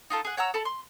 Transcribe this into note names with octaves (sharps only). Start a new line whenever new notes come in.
D#4 F4 A4
G#4 F#5
C#5 F#5 A#5 E6
A4 A5 B5
C6